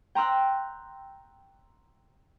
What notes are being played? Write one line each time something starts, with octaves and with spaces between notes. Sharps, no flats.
G5 A#5 C6 E6 F#6